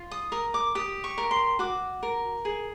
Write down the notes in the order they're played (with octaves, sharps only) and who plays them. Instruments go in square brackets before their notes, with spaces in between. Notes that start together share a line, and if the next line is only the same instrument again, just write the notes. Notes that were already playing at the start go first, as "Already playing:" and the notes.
Already playing: [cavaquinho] F4
D#6
A#4 D#6
D6
G4 D#6
C#6
A#4
C6
F#4 D6
A#4
G#4